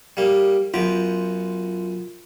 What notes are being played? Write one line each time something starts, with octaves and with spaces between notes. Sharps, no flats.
G3 A#3
F#2 B3 F4 A#5